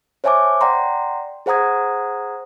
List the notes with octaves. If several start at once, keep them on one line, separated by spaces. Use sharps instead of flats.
C5 C#5 E5 G#5 A5 D6
D5 F#5 G5 A#5 C6
G#4 C5 F#5 A#5 D#6 G#6